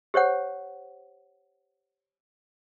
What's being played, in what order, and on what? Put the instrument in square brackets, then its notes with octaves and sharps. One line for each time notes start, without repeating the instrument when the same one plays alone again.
[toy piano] G4 C5 C#5 F#5